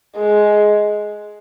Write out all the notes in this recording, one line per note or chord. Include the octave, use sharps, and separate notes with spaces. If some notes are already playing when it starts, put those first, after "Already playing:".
G#3